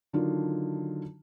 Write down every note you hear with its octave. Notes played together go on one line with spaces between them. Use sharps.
D3 D#3 F#3 D4 D#4 F4